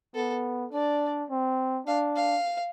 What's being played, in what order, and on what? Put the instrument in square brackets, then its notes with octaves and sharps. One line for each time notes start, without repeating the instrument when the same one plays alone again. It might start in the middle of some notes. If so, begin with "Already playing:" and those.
[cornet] B3 [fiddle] A4
[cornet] D4 [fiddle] D5
[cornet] C4
[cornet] D4 [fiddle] F5
[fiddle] F5